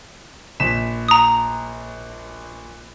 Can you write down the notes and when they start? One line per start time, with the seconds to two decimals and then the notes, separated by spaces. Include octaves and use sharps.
0.60 A#1 B6 E7
1.08 A#5 D#6